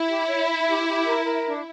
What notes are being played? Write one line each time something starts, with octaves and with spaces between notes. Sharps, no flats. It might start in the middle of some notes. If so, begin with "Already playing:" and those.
Already playing: E4
G4
C#5
E5
G4
G4
A#4
A#4
D4